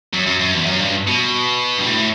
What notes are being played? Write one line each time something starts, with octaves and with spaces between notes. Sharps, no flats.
F#2
F#2
F#2
E2
F#2
G2
B2
G2
A2